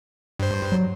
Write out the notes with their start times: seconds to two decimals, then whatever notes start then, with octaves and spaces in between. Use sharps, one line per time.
0.39 G2 C5
0.72 F#3